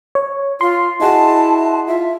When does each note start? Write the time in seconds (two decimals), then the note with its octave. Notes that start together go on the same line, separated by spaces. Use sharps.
0.15 C#5
0.61 F4 C6
1.01 E4 F#4 G#4 D#5 A5
1.88 F4 E5